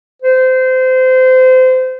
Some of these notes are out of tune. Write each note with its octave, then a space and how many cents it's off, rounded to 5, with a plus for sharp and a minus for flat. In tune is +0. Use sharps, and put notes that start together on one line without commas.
C5 -25